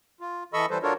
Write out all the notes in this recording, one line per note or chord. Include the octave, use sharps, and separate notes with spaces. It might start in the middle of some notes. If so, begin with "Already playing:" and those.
F4
E3 A4 D#5 B5 C#6 E6
E3 G3 A4 B4 C5
D4 F4 F#4 A4 A#4 C#5